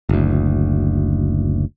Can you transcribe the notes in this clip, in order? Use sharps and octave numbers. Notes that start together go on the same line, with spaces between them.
F#1 D2